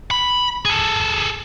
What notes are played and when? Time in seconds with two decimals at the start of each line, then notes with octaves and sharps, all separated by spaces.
0.11 B5
0.65 G#4 A4